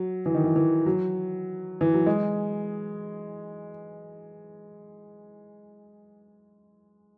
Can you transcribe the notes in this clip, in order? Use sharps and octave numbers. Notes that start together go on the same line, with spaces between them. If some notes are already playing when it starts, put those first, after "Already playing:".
Already playing: F#3
E3
D#3
E3
E3
F#3
E3
F#3
G#3